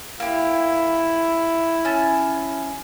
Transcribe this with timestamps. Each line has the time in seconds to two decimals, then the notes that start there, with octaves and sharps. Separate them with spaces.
0.20 A#3 E4 G4
1.85 C#4 A5